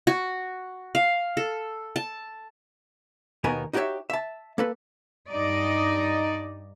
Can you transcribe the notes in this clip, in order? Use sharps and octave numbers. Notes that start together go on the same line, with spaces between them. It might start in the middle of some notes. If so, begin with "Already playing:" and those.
F#4
F5
A4
A5
D#2 B2 B3 D#4 A#4 G#5
D#4 F#4 G4 A#4 C#5 E5
E5 A5
A#3 A4 B4
G2 D#4 D5 D#5